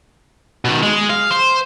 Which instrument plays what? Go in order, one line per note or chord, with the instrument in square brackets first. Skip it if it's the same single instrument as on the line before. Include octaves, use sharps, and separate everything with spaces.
[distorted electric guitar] B2 D#3
G#3
F5
C5